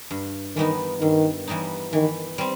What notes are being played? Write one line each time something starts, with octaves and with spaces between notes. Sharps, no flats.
G2
D#3 E3 G3 B3 D#4
G2 D#3
E3 G3 B3 D#4
D#3 E3
G3 C4